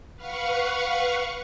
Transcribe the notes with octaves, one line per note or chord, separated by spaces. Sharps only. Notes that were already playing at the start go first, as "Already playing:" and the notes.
B4 F5 F#5 C#6